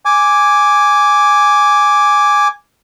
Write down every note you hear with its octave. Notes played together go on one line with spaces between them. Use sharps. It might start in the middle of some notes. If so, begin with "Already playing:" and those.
G#5 D6